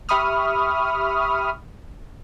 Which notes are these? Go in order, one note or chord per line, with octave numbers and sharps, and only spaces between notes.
G4 E5 B5 C#6 D#6 F6